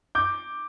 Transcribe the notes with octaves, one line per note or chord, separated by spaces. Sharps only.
D6 G6